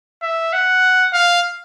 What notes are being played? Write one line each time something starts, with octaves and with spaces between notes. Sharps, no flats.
E5
F#5
F5